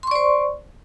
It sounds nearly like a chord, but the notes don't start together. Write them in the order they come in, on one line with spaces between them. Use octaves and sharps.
C6 C#6 D5 C5